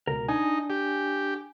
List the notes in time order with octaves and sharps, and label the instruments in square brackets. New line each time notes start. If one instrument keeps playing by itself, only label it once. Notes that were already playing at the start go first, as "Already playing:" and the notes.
[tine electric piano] C#2 B2 [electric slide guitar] A#4
[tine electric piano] D4 [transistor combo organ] D#4 [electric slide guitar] G#5
[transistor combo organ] G4